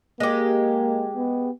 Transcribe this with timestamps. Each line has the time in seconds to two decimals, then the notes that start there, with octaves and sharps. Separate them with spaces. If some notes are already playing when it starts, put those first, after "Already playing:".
0.20 G#3 A#3 G4
1.16 B3